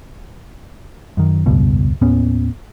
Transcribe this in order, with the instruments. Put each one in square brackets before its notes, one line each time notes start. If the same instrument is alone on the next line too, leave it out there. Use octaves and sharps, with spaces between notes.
[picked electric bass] F#2 D#3
F1 C#2 G2 B2
D#2 A2 B3 C#4